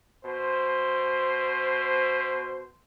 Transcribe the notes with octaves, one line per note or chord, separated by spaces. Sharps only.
B2 C5